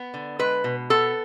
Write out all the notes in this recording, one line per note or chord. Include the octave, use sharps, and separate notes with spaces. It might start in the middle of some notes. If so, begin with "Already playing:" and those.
Already playing: B3
D3
G#3 B4
B2
B3 A4